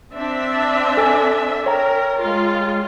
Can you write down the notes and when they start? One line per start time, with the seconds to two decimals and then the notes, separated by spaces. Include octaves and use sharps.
0.14 C4 D4 E5
0.97 A4 G#5 E6
1.66 A#4 C#5 G5 A#5
2.20 G#3 F4